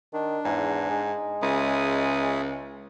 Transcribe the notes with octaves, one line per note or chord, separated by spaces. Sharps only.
D#3 D4
E2 G#2
G#3
C#2 E5 G#5 D#6